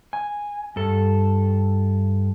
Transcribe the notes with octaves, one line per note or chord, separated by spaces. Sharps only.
G#5
G2 A4